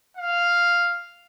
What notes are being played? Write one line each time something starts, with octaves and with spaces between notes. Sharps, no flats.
F5